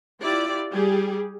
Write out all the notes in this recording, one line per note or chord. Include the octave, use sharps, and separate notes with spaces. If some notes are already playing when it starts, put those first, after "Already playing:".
E4 F4 G4 D5
G3 G4 G#4